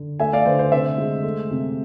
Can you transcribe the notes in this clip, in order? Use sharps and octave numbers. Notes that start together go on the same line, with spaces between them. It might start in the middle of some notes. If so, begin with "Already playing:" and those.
Already playing: D3
A3 E5 G#5
D5 F5
D3 C5
C5
C3 C5 E5
G#3
A3
C3